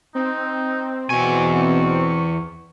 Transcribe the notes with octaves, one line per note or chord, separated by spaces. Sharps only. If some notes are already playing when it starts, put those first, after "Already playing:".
C4 D#4
E2 B2 G#5 C#6